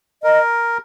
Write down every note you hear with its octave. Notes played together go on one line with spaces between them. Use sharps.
A#4 D#5